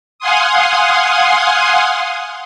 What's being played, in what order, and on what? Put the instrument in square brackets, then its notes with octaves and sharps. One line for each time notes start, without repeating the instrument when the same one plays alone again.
[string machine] F5 F#5 G#5 C6 D#6